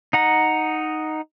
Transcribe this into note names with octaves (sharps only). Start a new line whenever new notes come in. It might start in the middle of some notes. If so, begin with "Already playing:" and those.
D#4 F#5 A#5